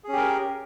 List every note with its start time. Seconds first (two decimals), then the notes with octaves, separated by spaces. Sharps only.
0.04 G#4
0.08 C#4
0.13 G4
0.17 A#4